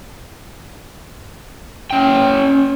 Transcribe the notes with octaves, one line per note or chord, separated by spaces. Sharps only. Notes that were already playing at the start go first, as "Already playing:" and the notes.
C#4 G5